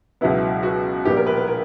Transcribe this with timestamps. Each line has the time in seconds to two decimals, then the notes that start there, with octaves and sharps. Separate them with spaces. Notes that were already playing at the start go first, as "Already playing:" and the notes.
0.21 C#2 B2 F#3 B3 E4
0.63 F#4
1.05 A#1 A#2 G3 B3 G4
1.17 A#4
1.27 B4
1.37 B4
1.47 A#4